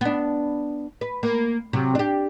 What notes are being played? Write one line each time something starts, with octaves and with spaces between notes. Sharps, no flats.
B3 D4
B4
A#3
C3 F#3
D4 G4